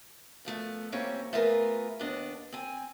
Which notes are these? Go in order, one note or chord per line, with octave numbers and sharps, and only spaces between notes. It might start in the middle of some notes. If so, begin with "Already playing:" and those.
A#2 F3 A3 B3
E3 G3 A#3 C4 C#4 C#5
A3 B3 F4 G#4 A#4 B4
D#2 B3 D4 D#5
C4 G#5